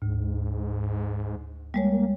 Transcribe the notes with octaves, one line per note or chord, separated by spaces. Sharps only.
D2 G#2
G3 G#3 A#3 C#5